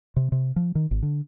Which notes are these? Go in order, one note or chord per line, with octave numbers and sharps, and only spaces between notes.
C3
C3
F3
D#3
G#1
D3